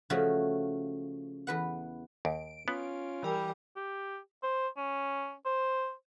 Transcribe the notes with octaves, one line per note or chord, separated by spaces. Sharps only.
C#3 F3 A3 F#4
E2 B4 F#5
D#2 D7
B3 C#4 F4
E3 G3 A#4 G#5
G4
C5
C#4
C5